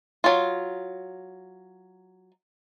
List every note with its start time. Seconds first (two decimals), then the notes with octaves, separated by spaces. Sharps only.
0.24 F#3 F4